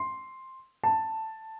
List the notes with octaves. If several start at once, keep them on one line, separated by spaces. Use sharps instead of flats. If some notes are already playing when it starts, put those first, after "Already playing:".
Already playing: C6
A5